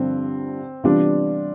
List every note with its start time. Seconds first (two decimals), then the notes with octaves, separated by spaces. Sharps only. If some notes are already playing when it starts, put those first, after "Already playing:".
Already playing: G2 D3 F3 C4
0.84 C3 E3 G3 B3 D4 F4